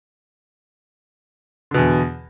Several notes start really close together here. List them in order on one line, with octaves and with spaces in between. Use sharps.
D3 B2 E2